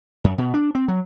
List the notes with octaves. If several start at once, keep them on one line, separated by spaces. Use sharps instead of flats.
F#2
B2
D4
C4
F#3